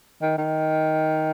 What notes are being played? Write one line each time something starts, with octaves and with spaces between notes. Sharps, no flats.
D#3
D#3